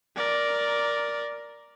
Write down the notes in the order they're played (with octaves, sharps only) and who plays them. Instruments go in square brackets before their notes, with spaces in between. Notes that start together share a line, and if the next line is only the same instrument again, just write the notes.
[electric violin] A#4 D5